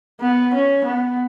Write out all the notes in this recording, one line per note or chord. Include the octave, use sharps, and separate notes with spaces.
B3
C#4
B3